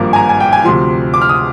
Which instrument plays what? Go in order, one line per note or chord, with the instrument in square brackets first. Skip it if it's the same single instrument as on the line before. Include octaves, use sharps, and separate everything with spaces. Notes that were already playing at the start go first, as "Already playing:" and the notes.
Already playing: [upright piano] G#1 G2 F3 A#3 D6
G#5
A#5
G#5
G5
G#5
D2 C3 F3 C6
D6
F6
D#6